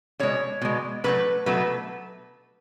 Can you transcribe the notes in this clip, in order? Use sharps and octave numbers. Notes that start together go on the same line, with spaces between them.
B2 G#3 C#5
B2 G#3
B2 F#3 A3 B4
B2 F#3 A3 B4